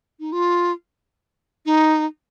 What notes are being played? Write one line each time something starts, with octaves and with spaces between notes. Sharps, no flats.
D#4
F4
D#4